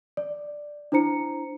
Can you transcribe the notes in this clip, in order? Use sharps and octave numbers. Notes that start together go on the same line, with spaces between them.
D5
D4 E4 C5 A#5 C#7